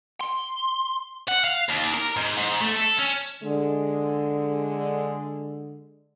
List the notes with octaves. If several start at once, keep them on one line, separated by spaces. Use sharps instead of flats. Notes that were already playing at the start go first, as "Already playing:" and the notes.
C6
F#5
F5
D#2
A#4
G#2
G#2
A3
A4
C#4
D3 G#3